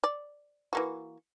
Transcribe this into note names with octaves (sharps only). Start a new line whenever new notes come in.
D5
E3 A#3 F#4